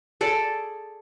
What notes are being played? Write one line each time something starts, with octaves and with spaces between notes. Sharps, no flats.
G#4 A4 D5